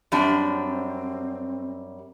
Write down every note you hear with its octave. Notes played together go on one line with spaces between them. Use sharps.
F#2 G3 C4 D4